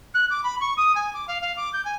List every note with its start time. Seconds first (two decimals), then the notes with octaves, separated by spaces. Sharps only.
0.14 F#6
0.30 D6
0.44 B5
0.60 C#6
0.77 D#6
0.95 G#5
1.14 D6
1.28 F5
1.41 F5
1.56 D6
1.73 G6
1.85 G#5